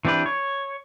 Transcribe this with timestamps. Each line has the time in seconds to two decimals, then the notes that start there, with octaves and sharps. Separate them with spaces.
0.05 E3 C4 D4 G4 B4
0.26 C#5